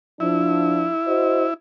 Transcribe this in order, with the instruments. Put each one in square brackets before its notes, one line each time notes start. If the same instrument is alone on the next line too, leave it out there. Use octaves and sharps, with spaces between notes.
[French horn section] F3 D4 [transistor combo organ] E4
[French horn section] F#4 C5 D#5